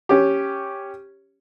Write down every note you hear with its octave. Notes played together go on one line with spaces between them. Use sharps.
C#4 G4